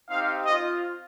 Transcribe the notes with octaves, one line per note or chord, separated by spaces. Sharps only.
C4 D#4 G4 F5
C4 F4 D#5